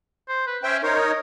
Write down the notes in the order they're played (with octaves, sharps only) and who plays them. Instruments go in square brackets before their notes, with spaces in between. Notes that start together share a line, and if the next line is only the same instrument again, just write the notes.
[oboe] C5
B4
[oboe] C#4 [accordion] C5 E5 G5
[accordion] D#4 A#4 C#5 [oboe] C5
[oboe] D#5